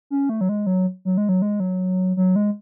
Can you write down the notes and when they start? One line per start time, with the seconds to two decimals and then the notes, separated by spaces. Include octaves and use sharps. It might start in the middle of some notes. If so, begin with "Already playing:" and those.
0.10 C#4
0.29 A3
0.41 F#3
0.49 G#3
0.66 F#3
1.05 F#3
1.17 G#3
1.29 F#3
1.42 G#3
1.60 F#3
2.17 F#3
2.36 G#3